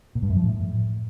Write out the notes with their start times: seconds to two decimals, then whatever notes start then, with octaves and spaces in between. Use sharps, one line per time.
0.15 A#2
0.22 G2
0.29 F#2
0.36 F3
0.43 A2